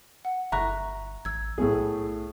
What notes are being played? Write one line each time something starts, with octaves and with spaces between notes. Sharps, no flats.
F#5
G1 E5 A#5 C#6 F#6
A1 E6 G#6
B1 A2 A3 B3 G#4